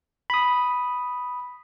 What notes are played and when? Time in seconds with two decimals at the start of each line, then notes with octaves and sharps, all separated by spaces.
0.30 B5 D#6